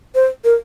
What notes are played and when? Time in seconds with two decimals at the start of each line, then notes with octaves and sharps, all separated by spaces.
0.15 C5
0.44 A#4